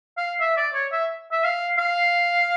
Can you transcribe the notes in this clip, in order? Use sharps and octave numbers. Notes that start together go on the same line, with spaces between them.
F5
E5
D5
C#5
E5
E5
F5
F5